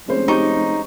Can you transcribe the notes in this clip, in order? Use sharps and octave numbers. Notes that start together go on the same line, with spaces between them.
F1 G#3 C#4 C5
C4 D#4 G4 C#6